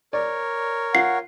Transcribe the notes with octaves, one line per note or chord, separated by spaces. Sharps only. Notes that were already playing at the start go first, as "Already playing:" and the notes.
A#4 C#5 D5
F4 F#5 C7